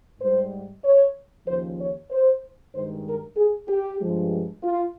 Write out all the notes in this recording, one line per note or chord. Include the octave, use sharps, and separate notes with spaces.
G#2 G3 C5
C#5
D#2 C#3 F3 C5
C#5
C5
G2 D#3 G#3 C5
A#4
G#4
G4
G2 F3 G#3
F4